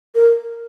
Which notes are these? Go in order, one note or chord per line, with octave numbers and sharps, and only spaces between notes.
A#4